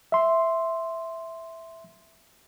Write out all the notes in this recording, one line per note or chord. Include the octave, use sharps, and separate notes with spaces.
E5 C6